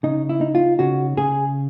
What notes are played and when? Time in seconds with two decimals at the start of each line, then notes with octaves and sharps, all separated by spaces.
0.03 C#3 D#4
0.29 E4
0.41 D#4
0.55 F4
0.79 C#3 F#4
1.17 C#3 G#4